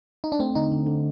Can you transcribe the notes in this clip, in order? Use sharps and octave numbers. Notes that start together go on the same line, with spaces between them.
D#4
D4
A3 C4
D3 D#4
D3
D3